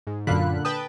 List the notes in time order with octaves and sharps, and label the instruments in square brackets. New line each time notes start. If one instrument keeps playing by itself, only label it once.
[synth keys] G#2
[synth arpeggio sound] F#2 F5 B5 [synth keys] A#2 D3 F#6
[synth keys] B4 G5 A5 [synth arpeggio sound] D#6